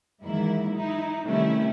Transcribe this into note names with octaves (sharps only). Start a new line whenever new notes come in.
G#2 D#3 E3 F#3 A#3 E4
D#4 E4
C3 D#3 G3 A3 C#4 E4